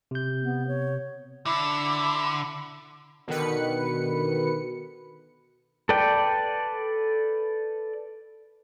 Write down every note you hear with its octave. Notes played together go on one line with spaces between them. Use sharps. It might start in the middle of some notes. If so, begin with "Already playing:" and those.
C3 G6
B3
C#5
D3 E4
B2 D3 D#3 B4 C#7
A4 B4 D5 G5